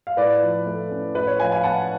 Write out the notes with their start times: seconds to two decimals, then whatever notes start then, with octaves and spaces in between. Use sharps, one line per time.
0.07 F5
0.17 A2 B4 D5
0.42 F3
0.66 A3
0.91 C#4
1.15 A2 B4
1.27 C#5
1.40 F3 F5 G#5
1.51 F5 G#5
1.63 B3 F#5 A5